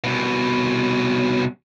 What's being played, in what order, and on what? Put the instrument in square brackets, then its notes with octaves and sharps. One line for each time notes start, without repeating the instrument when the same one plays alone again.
[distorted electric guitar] C2 B2